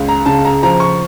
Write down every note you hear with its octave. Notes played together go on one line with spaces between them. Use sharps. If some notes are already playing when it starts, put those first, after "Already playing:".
Already playing: C#2
A#5
C#3 A5
A#5
F3 A#5
C#6